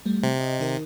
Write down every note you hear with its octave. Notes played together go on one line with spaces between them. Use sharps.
G3 A3
C3
D#5
D#3 D#4 A#4